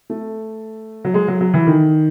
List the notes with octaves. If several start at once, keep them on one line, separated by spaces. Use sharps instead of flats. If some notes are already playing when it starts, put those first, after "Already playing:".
A3
F#3
G#3
F#3
F#3
E3
D#3